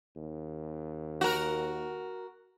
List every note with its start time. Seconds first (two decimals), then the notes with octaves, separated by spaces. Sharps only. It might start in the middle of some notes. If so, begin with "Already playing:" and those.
0.16 D#2
1.21 F#4 A#4